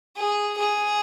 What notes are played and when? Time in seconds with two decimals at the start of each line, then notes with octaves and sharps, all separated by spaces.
0.16 G#4
0.58 G#4